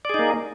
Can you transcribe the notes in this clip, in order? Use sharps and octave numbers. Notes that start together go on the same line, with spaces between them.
A#3 D#4 G#4 D5